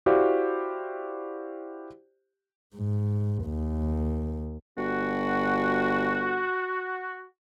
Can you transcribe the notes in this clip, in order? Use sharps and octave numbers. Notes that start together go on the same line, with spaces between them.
E4 F#4 G4 C5 D5 F5
G#2
D#2
G1 F#4